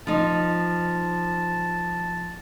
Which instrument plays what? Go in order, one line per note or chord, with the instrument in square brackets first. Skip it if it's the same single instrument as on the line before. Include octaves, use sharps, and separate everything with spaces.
[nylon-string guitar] F3 D#4 [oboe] A5